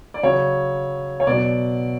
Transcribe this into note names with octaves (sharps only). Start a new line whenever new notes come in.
D5
C#3 F#3 C#5
C#5
B2 F#3 D5